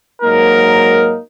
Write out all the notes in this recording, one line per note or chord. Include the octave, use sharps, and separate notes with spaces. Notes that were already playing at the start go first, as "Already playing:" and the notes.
G#2 F#3 A#3 D#4 A#4